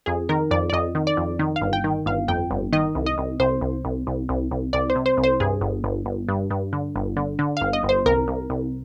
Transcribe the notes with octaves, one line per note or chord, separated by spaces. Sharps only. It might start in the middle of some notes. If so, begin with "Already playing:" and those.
F2 G#4
D#3 A#4
F2 D5
D5
F2 D#5
D#3
D5
F2
D#3
F5
G1
G5
D#3
G1 F5
F2 G5
G1
D#3 D#5
C2
D#5
C2
C2 C5
C2
C2
C2
C2
C2
C2 D5
C5
C3
C5
C2
C5
G2 G#4
G1
G1
G1
G2
G2
D3
G1
D3
D3
G1 F5
D#5
G1
C5
C2 A#4
C2
C2